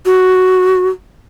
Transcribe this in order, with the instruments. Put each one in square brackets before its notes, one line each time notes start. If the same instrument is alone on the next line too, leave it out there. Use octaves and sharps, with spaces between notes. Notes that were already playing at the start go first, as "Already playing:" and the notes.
[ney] F#4